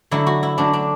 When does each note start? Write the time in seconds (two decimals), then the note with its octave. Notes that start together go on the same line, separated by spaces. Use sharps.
0.11 D3 F#3 A3 E4
0.27 F#4
0.43 E4
0.58 D3 F#3 A3 D4
0.73 D4